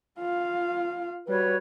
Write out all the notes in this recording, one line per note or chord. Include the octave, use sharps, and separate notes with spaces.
F4 F5
G3 F#4 B4 C#5